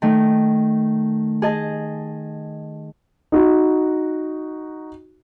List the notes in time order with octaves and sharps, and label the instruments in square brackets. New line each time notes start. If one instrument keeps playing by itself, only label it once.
[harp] D#3 A3
G#4 D#5 A5
[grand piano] D#4 F#4